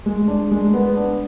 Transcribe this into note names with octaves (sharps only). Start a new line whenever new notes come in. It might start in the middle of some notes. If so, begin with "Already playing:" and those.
G#3
D4
G#3
B3
D4